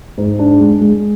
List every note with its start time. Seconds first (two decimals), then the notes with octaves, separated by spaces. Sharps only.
0.18 G#2
0.39 D4
0.60 G#3
0.81 G#3